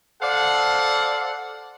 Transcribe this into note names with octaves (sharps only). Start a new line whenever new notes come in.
A4 C5 D5 F5 F#5